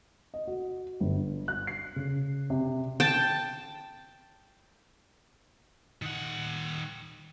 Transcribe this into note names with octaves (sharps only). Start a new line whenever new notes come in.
D#5
F#4
G1
F#6
C7
C#3
C3
G5 A5
D#3 F#5